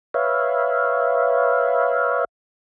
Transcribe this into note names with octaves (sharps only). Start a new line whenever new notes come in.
B4 C#5 E5 F5